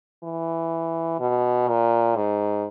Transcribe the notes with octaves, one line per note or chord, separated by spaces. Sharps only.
E3
B2
A#2
G#2